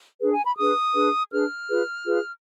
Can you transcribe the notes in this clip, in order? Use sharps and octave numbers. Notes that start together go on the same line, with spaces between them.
D4 G#4 B4
G#5
B5
D4 G#4 B4 D#6
D4 G#4 B4
D4 G#4 B4 F6
F4 G#4 B4
F4 G#4 B4